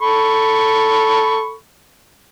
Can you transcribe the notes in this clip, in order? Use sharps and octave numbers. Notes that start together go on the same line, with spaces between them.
A4 B5 C#6